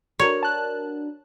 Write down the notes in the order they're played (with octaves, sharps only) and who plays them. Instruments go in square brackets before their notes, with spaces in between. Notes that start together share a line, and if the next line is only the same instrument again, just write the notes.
[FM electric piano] D4 F#4 A#4 [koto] C#5
[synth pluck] A5 F#6